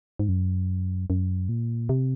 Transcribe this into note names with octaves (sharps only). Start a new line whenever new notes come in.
G#2
F#2
F#2
A#2
C3